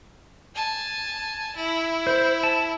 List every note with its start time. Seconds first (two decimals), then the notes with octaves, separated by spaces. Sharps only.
0.55 G#5 A5
1.56 E4
2.07 C5
2.43 A5